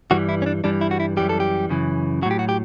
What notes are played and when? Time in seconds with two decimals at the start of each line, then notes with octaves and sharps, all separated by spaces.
0.11 G2 E3 G3 F#4
0.29 E4
0.42 C#4
0.46 D4
0.64 G2 E3 G3 D4
0.81 E4
0.91 F#4
1.00 E4
1.17 F#2 E3 G3 G4
1.29 A4
1.40 G4
1.70 F#2 C#3 E3
2.22 F#3 F#4
2.26 A2 G4
2.39 F#4
2.49 G4